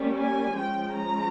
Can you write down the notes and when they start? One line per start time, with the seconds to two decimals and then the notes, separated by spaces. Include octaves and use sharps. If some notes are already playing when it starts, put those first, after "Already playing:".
Already playing: G3 A#3 C#4
0.17 G#5
0.56 F3 G#3 C#4 G5
0.96 A#5